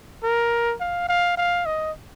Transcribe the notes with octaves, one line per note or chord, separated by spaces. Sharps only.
A#4
F5
F5
F5
D#5